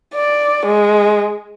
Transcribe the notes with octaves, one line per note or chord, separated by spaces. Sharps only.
D5
G#3